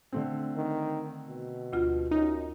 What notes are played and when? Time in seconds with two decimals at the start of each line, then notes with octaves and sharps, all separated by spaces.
0.13 D3 A3 C4
0.56 D#3
1.28 B2
1.73 D2 F4
2.11 F#2 D#4